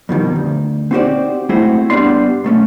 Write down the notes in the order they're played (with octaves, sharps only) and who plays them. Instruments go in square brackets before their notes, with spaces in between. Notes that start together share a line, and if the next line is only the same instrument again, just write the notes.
[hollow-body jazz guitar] F2 B2 D#3 G3
D2
C4 D#4 F#4 G4 C5 D5
G#3 A3 C4 E4 F#4
G2 G3 B3 D4 D5 C6
B1 A3 C#4